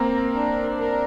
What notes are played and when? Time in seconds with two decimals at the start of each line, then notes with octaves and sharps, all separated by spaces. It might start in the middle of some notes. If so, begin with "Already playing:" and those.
Already playing: A#3 C4 A#4
0.34 D4
0.77 A#4